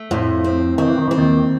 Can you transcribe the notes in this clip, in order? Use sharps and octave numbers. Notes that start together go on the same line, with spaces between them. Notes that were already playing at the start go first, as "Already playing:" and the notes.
Already playing: A3
F2 A2 F3
C4
D#3 C4
E3
D#3
E3 C4
D#2 D#3